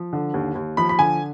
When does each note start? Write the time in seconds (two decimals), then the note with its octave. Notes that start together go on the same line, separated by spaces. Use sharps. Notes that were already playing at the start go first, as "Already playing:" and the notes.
Already playing: F3
0.13 D3
0.34 D#2
0.55 D#2
0.77 F3 B5
0.89 B5
0.99 D3 G#5